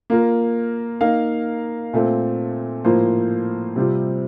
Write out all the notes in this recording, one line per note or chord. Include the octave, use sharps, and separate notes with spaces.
A#3 F4 A#4
A#3 D#4 A#4 F5
A#2 A3 C4
A2 F3 A#3 F4 C5
C3 G3 C4 F4